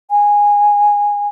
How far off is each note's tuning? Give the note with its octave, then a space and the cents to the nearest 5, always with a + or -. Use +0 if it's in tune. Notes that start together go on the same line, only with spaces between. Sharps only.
G#5 -15